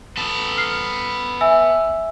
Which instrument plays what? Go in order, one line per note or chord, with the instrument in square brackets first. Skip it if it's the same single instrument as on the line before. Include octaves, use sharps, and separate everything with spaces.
[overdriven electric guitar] B3 A4
[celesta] F6 C7
E5 G#5 E6